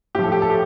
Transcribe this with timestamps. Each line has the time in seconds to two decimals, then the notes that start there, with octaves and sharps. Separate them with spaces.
0.15 A2 F3 G4
0.24 A4
0.32 G4
0.42 A4
0.50 G4